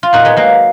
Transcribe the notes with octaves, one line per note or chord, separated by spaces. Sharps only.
F4
A#2 D#4 F#4
G#3 B3
F#3 A#3